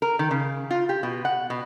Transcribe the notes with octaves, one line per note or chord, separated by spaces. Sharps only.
A#4
D#3
C#3
F4
G4
B2
F#5
B2